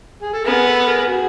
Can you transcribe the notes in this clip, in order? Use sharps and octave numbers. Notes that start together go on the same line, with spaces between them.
G#4
A4
B3 G#4 A#4
A4 B4
B4
G#4 A#4
F#4 G#4